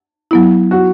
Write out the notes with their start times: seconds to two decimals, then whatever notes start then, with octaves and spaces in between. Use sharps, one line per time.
0.31 F#3 B3 E4
0.71 F#4